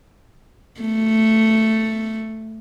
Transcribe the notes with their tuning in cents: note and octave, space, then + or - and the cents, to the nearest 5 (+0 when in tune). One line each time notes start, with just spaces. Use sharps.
A3 +5